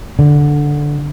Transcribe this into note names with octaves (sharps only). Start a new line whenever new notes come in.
D3